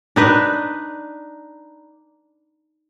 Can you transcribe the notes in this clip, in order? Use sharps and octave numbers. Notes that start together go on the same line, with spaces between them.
D4 D#4 B4